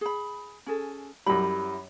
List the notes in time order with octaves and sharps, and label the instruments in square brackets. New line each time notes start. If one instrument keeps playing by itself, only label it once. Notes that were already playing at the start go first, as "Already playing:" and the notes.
[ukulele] G#4 B5
C#4 G#4 A4
[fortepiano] F#2 G3 [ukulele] E4 B5